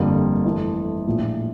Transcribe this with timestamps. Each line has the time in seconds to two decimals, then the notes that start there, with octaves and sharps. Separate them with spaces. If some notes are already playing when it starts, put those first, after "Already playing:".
Already playing: G1 F2 D3 G3 A#3
0.44 F2 E3 A3 E4
1.06 A#1 A2 F3